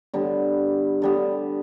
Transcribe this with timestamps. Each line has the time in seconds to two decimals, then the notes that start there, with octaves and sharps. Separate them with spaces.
0.14 D3 G3 B3
1.02 D3 G3 B3